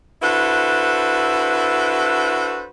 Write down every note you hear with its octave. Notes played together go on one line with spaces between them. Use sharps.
D4 E4 F#4 A4 B4 C5